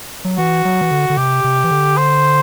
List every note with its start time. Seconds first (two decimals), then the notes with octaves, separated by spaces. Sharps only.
0.25 F#3
0.38 E3 F#4
0.65 F#3
0.81 E3
0.91 D3
1.10 D3
1.17 C3 G4
1.44 C3
1.64 E3
1.71 D3
1.97 C5